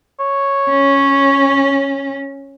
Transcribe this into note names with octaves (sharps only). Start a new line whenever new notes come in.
C#5
C#4